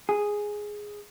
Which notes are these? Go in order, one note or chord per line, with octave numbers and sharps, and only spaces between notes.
G#4